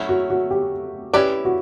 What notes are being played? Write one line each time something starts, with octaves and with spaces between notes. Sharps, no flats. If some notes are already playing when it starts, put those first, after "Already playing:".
Already playing: F#3 A3 C#4 E4
F#4
F#4
G4
C#4 E4 G4 B4 D5
F#4